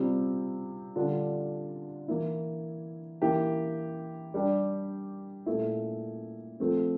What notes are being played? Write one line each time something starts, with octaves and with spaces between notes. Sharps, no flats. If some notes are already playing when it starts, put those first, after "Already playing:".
Already playing: C3 G3 C4 F4
D3 G3 D4 F4
E3 A#3 E4
E3 A#3 E4 G4
G3 D4 G4
A#2 A3 E4
F3 A3 C4